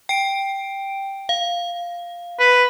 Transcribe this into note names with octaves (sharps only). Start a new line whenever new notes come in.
G5 D7
F5
B4